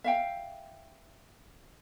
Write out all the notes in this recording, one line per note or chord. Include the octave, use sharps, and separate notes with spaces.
E5 F5 G5